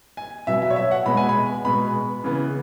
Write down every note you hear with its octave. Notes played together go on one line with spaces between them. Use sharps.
G#5
B2 F#3 B3 E5
E5
C#5
E5
F#5
B2 G#3 B3 B5
G#5
B5
B2 G#3 B3 B5
C#3 E3 B3